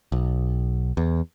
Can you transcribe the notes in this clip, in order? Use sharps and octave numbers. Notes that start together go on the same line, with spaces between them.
B1
E2